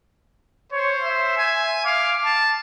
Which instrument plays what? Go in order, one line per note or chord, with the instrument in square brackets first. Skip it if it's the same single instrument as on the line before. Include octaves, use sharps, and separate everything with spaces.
[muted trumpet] C5 [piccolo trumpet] C#5
[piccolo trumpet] E5
[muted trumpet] G#5
[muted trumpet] F5 [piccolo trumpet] D6
[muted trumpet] A5